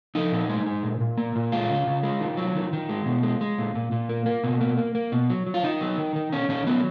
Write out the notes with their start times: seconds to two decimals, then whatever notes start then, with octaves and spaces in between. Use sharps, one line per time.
0.15 F3 D#4
0.32 A#2
0.49 G#3
0.66 G#3
0.83 A#2
1.01 A#2
1.18 A#3
1.36 A#2
1.52 G#3 F4
1.70 C#3
1.87 C#3
2.03 G#3
2.21 D#3
2.37 F#3
2.55 D#3
2.73 D#3
2.89 G#3
3.06 B2
3.23 G#3
3.41 G#3
3.58 A#2
3.75 A#2
3.92 A#2
4.09 A#3
4.26 A#3
4.44 B2
4.61 A#3
4.77 A#3
4.95 A#3
5.12 B2
5.30 F#3
5.47 F#3
5.54 F4
5.63 D#3 D#4
5.81 F#3
5.98 D#3
6.15 D#3
6.32 D#3 C#4
6.49 D#3 C#4
6.67 F#3 B3